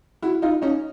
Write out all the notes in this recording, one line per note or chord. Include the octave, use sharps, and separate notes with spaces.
E4 F#4
D#4 F4
C#4 D#4